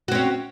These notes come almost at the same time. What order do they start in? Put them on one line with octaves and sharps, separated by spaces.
F#4 C4 C#4